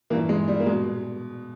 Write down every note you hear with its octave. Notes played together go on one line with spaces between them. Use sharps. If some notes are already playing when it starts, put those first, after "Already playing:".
G2 E3 A#3
G#3
G3
A#3
B2 G#3